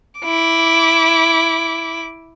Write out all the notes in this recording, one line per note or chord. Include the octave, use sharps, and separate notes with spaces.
E4 D6